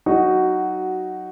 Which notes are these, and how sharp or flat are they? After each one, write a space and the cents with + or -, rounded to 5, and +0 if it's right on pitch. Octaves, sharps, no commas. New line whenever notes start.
F#3 +15 D#4 +0 F#4 +5